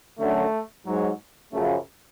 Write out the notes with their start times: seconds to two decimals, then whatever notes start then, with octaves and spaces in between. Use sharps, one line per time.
0.20 F#2 D3 F#3 A3
0.86 G#2 F#3
1.53 F#2 C#3 F3 A3